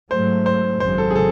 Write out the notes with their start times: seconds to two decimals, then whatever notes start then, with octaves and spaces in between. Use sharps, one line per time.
0.11 G#2 F#3 A3 C5
0.46 C5
0.80 G#1 F#2 C#3 F#3 C5
0.98 A4
1.11 G#4
1.15 A4